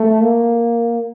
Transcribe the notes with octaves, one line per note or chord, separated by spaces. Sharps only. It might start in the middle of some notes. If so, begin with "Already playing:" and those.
Already playing: A3
A#3